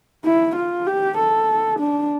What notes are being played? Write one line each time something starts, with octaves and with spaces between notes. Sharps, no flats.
E4
F4
G4
A4
D4